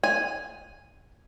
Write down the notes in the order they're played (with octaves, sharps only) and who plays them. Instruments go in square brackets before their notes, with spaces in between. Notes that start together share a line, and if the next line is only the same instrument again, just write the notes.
[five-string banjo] G#5